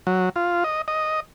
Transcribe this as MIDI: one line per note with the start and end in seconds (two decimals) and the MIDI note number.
0.07 0.29 54
0.36 0.64 65
0.64 0.82 75
0.88 1.20 75